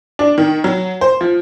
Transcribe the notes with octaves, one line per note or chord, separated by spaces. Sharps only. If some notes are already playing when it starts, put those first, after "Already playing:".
D4
D#3
F#3
C5
F3